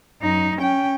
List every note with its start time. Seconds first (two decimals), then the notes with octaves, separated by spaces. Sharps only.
0.22 F#2 D#4
0.59 C#4 G5